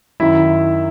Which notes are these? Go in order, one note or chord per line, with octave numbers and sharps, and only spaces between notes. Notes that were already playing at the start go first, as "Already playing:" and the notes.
F#2 D#3 E4 E5